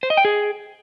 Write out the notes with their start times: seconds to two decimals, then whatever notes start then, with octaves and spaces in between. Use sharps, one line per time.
0.03 C5
0.10 D#5
0.17 G5
0.25 G#4